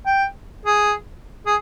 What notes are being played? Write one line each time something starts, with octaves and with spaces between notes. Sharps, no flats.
G5
G#4
G#4